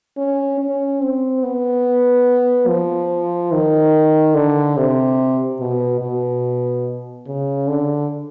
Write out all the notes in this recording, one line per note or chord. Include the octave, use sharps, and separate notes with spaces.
C#4
C#4
C4
B3
F3
D#3
D3
C3
B2
B2
C#3
D3